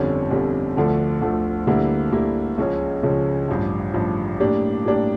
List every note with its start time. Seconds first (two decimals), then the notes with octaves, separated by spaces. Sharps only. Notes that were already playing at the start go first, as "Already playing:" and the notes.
Already playing: G1 F2 D3 G3 C#4
0.31 G1 F2 D3 G3 C#4
0.76 D2 D3 F3 A3
1.21 D2 D3 F3 A3
1.67 D2 D3 G3 A#3 E4
2.12 D2 D3 G3 A#3 E4
2.58 C#2 C#3 F3 C#4
3.03 C#2 C#3 F3 C#4
3.48 A1 G2 F3
3.94 A1 G2 F3
4.40 A2 G3 A#3 D4 G4
4.85 A2 G3 A#3 D4 G4